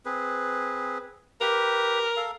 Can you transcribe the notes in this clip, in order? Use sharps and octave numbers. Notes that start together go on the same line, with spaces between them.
C4 G#4 B4
G4 A#4 B4
A4 F5